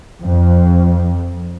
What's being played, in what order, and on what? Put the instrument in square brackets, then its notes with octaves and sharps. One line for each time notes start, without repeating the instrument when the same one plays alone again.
[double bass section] F2